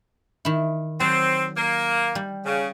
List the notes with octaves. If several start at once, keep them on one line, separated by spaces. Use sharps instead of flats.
D#3 E4
F#3 C4 A5
A#3
G3
C#3